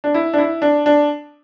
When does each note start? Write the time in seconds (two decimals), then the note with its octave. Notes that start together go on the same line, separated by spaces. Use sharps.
0.04 D4
0.14 E4
0.33 D4
0.38 E4
0.62 D4
0.86 D4